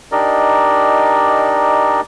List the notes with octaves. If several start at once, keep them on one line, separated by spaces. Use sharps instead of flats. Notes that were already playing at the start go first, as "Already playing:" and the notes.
D4 D#4 G4 A#4 D5 D#5